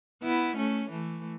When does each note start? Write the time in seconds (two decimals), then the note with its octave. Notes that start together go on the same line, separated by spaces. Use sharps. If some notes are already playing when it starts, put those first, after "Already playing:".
0.22 B3 E4
0.56 A3 C#4
0.90 E3 A3